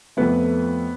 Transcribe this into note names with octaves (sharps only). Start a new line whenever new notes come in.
F2 F3 A3 B3 B4